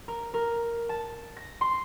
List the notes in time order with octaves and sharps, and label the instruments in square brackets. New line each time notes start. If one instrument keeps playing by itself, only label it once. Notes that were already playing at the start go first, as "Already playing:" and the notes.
[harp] A#4
A#4
A5
A#6
C6